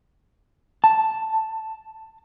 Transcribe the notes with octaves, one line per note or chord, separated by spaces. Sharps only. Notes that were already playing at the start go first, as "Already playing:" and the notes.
A5